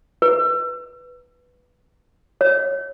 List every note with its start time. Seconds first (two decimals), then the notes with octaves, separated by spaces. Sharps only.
0.22 B4
2.41 C#5